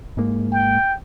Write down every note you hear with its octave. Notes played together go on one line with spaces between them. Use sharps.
G#2 G#3 A#3
G5